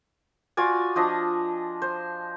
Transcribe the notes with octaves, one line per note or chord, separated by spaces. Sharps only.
F4 F#4 D5 G#5
F3 D4 D#5
C5